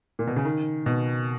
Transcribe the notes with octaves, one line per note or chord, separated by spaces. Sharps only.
A#2
B2
C#3
D#3
B2